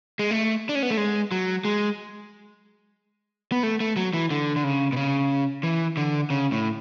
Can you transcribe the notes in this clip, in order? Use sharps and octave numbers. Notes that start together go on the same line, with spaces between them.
G#3
A3
D4
C#4
B3
A3
G#3
F#3
G#3
B3
A3
A3
F#3
E3
D3
D3
C#3
B2
C#3
E3
D3
C#3
A2